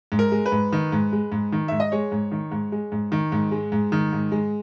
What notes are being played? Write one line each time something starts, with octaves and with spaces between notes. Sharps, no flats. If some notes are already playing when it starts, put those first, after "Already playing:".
G#2
A#4
G#3
B4
G#2
D#3
G#2
G#3
G#2
D#3
G#2 E5
D#5
G#3 C#5
G#2
D#3
G#2
G#3
G#2
D#3
G#2
G#3
G#2
D#3
G#2
G#3